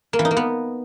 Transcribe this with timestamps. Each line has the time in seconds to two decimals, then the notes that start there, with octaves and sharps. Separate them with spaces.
0.13 A#3
0.19 E3
0.25 D#4
0.31 A#3
0.37 B3